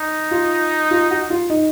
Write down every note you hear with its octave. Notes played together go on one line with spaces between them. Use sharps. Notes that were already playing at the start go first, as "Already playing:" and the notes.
Already playing: D#4
F4
F4
F#4
F4
D#4